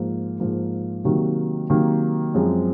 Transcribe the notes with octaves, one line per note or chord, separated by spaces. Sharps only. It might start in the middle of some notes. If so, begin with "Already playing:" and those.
Already playing: G#2 F3 A#3
G#2 F3 A#3
C3 D#3 F#3 A#3
C3 D#3 F#3 A#3
F#2 F3 G#3 C4